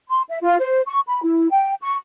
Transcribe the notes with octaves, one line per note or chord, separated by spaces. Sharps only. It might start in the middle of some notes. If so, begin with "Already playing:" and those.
C6
E5
F4
C5
C#6
B5
E4
G5
C#6